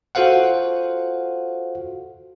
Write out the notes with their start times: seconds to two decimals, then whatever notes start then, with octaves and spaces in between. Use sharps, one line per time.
0.15 F4 F#4 A4 C5 F5 F#5